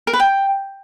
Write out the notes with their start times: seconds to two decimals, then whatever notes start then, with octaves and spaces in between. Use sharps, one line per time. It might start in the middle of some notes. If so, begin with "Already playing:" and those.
0.07 A#4
0.13 B4
0.20 G5